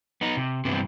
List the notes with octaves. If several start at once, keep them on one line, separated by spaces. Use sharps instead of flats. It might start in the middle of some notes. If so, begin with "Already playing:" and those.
B3 D#4
C3
G2 C3 E3 B3 C4